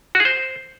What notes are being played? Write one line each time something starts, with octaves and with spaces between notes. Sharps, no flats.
F#4
G#4
C5